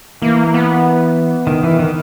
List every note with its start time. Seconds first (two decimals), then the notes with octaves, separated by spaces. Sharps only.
0.22 E3 A#3
0.54 B3
1.47 D#3
1.63 E3
1.79 D#3